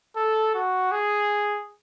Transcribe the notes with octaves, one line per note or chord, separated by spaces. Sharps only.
A4
F#4
G#4